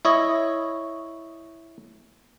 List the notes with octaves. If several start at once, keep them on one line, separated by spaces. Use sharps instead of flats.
E4 C#5 D#5